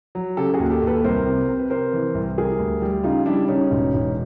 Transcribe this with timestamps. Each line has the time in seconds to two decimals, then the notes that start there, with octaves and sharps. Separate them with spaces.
0.15 F#3
0.37 C#3 G4 A4
0.54 F#4 G#4
0.59 D#2
0.71 G4 A4
0.82 D#2
0.87 A4 B4
1.04 C2 A#4 C5
1.26 C3
1.48 C3
1.59 B4
1.70 C3 A#4 C5
1.93 E3
2.15 C2
2.38 G3 G#4 A#4
2.59 D2
2.82 G3
3.04 C#3 D#4 F4
3.26 G3 D4 E4
3.48 C#3 C#4 D#4
3.71 E1
3.94 E1